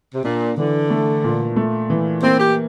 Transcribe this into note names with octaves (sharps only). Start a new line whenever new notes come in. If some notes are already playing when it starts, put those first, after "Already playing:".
C3
A#2 D4
D3 E3
A3
A#2
A3
E3
A#3 C4
G4